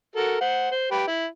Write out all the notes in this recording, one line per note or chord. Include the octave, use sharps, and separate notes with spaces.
F#4 A4 A#4
C5 F#5
C5
G4 B4
E4